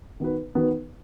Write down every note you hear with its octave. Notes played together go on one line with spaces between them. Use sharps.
D#3 B3 F#4 B4
D#3 B3 F#4 B4